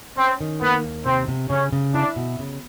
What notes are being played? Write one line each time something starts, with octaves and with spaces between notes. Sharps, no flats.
C4 C#4
D#3
A#3 B3
D#2
C3 C4
C3
C#3 C#4
C#3
D4 E4
B2
C#3